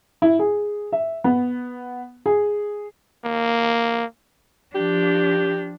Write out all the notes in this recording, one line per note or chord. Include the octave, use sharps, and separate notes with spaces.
E4
G#4
E5
B3
G#4
A#3
F3 D4 G4